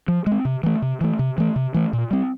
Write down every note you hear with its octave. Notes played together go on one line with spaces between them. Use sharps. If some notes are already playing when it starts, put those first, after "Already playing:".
F3
G#3
C4
C3
E3 A3
C3
E3 A3
C3
E3 A3
C3
E3 A3
A#2
G3 C4